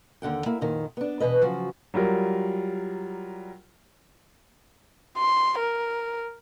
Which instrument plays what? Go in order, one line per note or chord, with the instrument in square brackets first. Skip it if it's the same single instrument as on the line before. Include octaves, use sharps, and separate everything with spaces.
[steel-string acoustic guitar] D#2 D3 F#5 G5
A#3 E4
F2 A#2 D#3
B3 D4
E2 G#2 B2 B4 D#5
C#3 F3 F#3 F#4
[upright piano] F#3 G3 F4 A#4
[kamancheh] C6
A#4